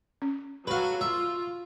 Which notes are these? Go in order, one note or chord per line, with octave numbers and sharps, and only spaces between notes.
C#4
F#3 F#4 A4 B4 F5
F4 E5